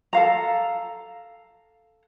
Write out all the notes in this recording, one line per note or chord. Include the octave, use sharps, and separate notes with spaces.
A4 F5 A#5